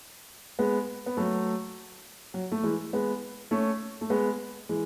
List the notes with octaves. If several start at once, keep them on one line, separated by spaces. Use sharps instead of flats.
G#3 B3
B3
F#3 A3
F#3
A3
E3 G#3
G#3 B3
A3 C#4
A3
G#3 B3
E3 G#3